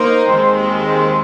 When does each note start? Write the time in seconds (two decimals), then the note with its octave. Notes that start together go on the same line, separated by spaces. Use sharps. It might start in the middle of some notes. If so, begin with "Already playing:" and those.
Already playing: A#3 D#4 A#4 C5
0.27 D#2 D#3 G#3 C4
0.88 C5